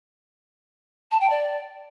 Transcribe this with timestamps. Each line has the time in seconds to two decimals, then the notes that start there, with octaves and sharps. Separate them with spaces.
1.11 A5
1.20 G5
1.29 D5